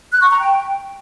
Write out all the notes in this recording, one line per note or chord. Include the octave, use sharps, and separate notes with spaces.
F#6
C#6
A#5
G5